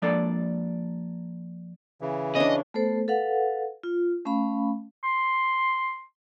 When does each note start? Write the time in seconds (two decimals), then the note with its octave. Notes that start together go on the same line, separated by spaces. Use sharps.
0.02 F3 G#3 A#3 D4 A4 D5
2.01 C#3 E3
2.36 C#4 D4 D#5
2.74 A3 B3 A4 C5
3.08 A4 B4 F5 F#5
3.83 F4
4.25 A3 C#4 F5 B5
5.04 C6